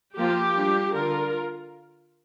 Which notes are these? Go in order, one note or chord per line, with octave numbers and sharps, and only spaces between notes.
F3 A#3 F4 G4
G3 D4 F4
D3 F4 A#4